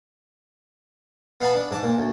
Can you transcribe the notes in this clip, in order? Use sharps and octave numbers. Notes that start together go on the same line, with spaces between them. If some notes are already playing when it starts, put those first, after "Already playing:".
B3 F5 F#5 G#5 A5 B5
D4
G#2 A5 D6
A#2
D2